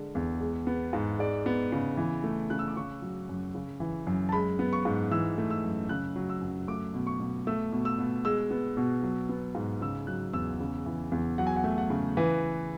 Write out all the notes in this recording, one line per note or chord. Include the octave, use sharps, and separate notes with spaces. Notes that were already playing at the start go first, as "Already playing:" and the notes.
Already playing: D3 G#3
E2
G#3
B3
G#2
G#3 D5
B3
C#3
E3
A3
C#3 F#6
E6
D6
C#3 C#6
F#3
F#2
C#3
E3
F#2
A5
G#3 B5
B3
C#6
G#2
E3 E6
A3
E6
F#2
C#3 F#6
F#3
E6
F#2
A3 D6
B2
C#6
B2
A3 E6
B2
E6
B2
G#3 E6
B3
B2
F#3
B3
G#2
C#3 E6
F#3 F#6
E2 E6
C#3
E3
E2
F#3 F#5
G#5
F#5
A3
F#5
C#3
E3 B4